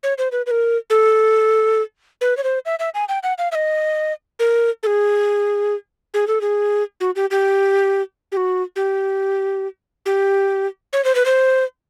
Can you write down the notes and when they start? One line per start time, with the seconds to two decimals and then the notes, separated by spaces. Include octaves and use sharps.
0.03 C#5
0.18 C5
0.32 B4
0.46 B4
0.51 A#4
0.90 A4
2.21 B4
2.37 C#5
2.44 C5
2.66 E5
2.79 E5
2.94 G#5
3.09 G5
3.23 F#5
3.38 F5
3.52 E5
3.55 D#5
4.39 A#4
4.83 A4
4.87 G#4
6.14 G#4
6.27 A4
6.41 G#4
7.00 F#4
7.16 G4
7.31 G4
8.32 G4
8.37 F#4
8.76 G4
10.06 G4
10.93 C#5
11.05 C5
11.15 B4
11.26 C5